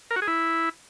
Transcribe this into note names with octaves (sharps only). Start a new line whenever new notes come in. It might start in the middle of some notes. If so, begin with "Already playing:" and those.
A#4
F#4
G#4
E4